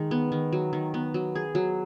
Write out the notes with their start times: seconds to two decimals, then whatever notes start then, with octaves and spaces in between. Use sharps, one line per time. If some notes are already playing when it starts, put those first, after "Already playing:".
Already playing: D#3 G#3 D#4
0.11 B3
0.32 D#3
0.53 F#3
0.73 D#3
0.94 B3
1.14 F#3
1.35 G#4
1.55 F#3